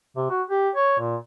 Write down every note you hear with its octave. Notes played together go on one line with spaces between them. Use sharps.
C3
F#4
G4
C#5
A#2